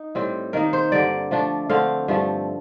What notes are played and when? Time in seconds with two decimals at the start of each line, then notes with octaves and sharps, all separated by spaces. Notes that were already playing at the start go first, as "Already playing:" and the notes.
Already playing: D#4
0.15 A2 G3 C4
0.53 D#3 A#3 D#4 A#4
0.73 C5
0.92 G2 D3 G3 D5
1.31 F3 A3 D4
1.69 D3 A3 C4 F5
2.08 G2 F3 A3